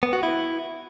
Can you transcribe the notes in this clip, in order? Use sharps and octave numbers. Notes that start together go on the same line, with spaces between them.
B3
F#4
E4